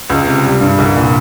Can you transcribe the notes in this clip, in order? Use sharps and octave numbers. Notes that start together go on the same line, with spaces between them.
C#2
C3
G3
G2
C2
A#2